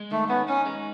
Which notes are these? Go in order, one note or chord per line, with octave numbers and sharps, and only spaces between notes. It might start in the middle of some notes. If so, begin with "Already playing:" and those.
Already playing: G#3
D#3 A3
B3 C#4
C#4 D#4
G#3